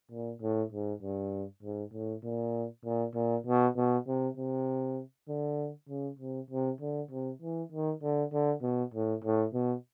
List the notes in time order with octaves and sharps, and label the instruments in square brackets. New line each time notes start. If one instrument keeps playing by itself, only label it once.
[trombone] A#2
A2
G#2
G2
G#2
A2
A#2
A#2
A#2
B2
B2
C3
C3
D3
C#3
C3
C3
D3
C3
E3
D#3
D3
D3
B2
A2
A2
B2